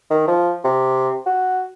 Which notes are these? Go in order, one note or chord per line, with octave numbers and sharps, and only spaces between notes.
D#3
F3
C3
F#4